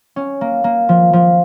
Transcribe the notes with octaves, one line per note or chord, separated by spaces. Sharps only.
C#4
A#3
A#3
F3
F3